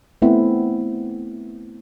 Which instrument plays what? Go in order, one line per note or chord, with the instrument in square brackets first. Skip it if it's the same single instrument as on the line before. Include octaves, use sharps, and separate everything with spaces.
[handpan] A3 B3 C4 E4